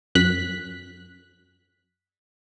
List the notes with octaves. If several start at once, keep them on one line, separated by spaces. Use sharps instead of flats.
F#2 F#6 B6